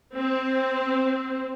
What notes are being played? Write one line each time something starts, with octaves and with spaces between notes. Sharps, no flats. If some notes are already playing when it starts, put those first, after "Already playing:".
C4